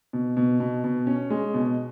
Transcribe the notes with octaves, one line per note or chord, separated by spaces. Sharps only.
B2
B2
B2
B2
C#4
G#3
B2